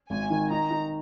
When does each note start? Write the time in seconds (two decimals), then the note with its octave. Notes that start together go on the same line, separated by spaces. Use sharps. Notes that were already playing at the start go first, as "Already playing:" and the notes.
0.10 G#1 G#5
0.30 D#3
0.50 D#4 A#5
0.71 D#4